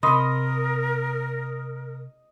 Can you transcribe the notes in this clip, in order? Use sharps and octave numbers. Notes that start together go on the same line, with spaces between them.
C3 A#4 D#5 B5 C6